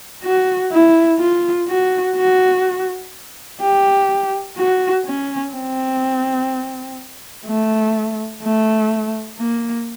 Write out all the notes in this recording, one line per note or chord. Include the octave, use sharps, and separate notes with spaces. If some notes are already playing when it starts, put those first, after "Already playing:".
F#4
E4
F4
F#4
F#4
G4
F#4
C#4
C4
A3
A3
A#3